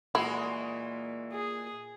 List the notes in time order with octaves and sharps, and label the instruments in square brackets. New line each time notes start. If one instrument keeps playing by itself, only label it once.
[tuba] A#2 [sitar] E3 G#3 F#4 [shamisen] E4
[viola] G#4